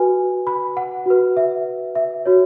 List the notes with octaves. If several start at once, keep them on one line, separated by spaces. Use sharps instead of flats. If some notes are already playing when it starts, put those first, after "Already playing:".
Already playing: F#4 B4 G#5
B5
F#5
F#4 B4
E5
E5
F#4 C#5